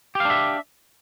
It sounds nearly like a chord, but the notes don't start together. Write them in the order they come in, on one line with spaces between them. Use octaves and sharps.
G4 F5 D4 E5